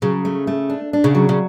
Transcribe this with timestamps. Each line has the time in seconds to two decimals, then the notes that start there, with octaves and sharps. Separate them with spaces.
0.02 C#3 F#3
0.25 A3
0.47 A3
0.70 D4
0.93 D4
1.04 C#3
1.15 F#3
1.29 C#3